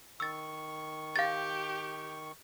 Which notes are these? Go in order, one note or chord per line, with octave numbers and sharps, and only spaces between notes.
D#3 C#6 E6 A6
G4 F5 A6